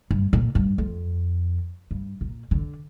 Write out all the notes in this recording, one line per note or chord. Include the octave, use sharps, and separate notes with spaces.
G2
A#2
G2
F2
G2
A#2
D3